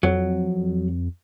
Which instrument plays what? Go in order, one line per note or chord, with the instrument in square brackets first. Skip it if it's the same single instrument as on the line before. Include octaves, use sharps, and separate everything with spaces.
[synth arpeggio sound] F2 [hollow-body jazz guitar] F#3